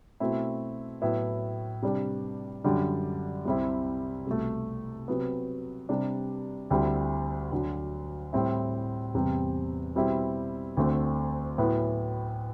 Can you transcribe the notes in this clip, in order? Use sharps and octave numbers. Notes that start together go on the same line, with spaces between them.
B2 A3 C4 E4
A2 F#3 B3 E4
C3 G3 D4
F#2 D3 G3 D4
C2 C3 G3 C4 E4
C2 B2 A3
C3 F#3 B3
C3 G3 D4
D2 D3 G3 C4 E4
D2 D3 F#3
A2 G3 C4 E4
E2 C3 G3 C4
B2 G3 C4 E4
D2 D3 A3 C4
A2 F#3 B3 E4